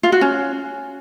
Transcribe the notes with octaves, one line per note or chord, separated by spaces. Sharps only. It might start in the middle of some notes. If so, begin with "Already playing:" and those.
F4
F#4
C#4